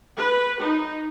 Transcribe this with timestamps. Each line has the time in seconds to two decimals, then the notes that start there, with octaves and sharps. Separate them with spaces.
0.20 B4
0.62 D#4